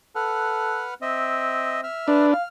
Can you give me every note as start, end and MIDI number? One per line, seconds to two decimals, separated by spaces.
0.15 0.87 69
0.15 0.94 71
0.15 0.94 78
0.15 0.94 89
1.02 1.85 60
1.02 1.81 75
1.02 1.81 76
1.84 2.26 76
1.84 2.26 89
2.08 2.34 62
2.08 2.30 71
2.33 2.43 77
2.33 2.48 89